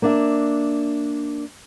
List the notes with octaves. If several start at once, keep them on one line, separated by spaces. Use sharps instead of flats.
A#3 D4 E5